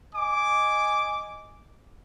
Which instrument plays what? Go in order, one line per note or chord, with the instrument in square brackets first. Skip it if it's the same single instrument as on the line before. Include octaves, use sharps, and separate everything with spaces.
[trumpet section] D#5 G#5 D6